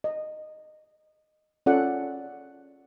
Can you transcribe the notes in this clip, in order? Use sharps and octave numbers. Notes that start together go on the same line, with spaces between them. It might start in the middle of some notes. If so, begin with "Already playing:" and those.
D#5
C#4 F4 A4 D5 F#5